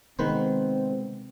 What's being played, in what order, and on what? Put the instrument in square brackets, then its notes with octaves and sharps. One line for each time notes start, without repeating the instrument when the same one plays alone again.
[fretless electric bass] C3 G#3 B3 [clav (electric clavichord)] D#3 B4 C5 [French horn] C4